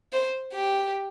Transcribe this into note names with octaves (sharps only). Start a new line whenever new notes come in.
C5
G4